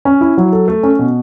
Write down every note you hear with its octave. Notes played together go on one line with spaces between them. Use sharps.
C#4
E4
F#3
A4
A3
C#4
B2